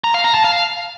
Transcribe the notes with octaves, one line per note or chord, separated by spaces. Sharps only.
A#5
F5
A#5
A5
F5